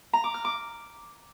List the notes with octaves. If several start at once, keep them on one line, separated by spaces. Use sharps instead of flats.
A#5
D6
F6
D6